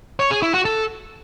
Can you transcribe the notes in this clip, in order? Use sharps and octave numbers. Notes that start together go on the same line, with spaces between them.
C#5
G#4
E4
F#4
A4